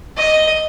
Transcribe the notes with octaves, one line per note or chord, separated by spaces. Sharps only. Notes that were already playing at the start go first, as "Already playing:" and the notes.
D#5